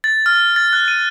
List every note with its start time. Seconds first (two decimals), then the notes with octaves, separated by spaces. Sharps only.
0.04 A6
0.26 F6
0.56 A6
0.73 F#6
0.88 D#7